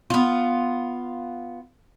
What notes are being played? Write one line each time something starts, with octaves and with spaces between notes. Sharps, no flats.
B3 F4